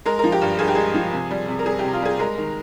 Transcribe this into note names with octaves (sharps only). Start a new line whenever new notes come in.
G#3 A#4
A#4
F3
G4
G2
G2 G#4
G4
G#3 G#4
F3
C3
G3
C3
A#4
G3 G#4
G4
C3
F4
G3 G#4
G#3 A#4
D#3